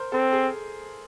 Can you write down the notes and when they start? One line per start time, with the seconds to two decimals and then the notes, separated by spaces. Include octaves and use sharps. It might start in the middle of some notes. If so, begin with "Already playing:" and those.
Already playing: A#4 C5
0.12 C4 A4
0.32 G#4